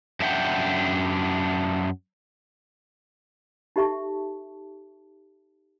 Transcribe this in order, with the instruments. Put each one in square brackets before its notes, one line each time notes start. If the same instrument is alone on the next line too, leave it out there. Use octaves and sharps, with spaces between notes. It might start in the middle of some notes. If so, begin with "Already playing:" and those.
[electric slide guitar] F#2 D4 E5 F#5 G5
[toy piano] D#4 G4 A4 E5 A5 C#6